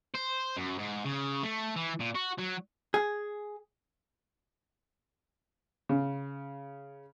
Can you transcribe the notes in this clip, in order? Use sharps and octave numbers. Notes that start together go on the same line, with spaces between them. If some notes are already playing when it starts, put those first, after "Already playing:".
C5
F#2
G#2
C#3
A3
E3
A#2
F#4
F#3
G#4
C#3